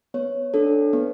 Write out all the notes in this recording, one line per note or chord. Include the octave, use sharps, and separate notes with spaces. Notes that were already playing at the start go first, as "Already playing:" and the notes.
B3 C#5
D4 A4
B3